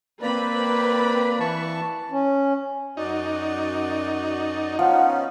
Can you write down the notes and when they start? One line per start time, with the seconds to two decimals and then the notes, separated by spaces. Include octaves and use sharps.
0.22 A#3 C4 B4 D5 B5
1.40 E3 A5 C#6
2.12 C#4
2.97 F#2 D#4 F#4 D5
4.79 F3 B3 C#4 D#4 F#5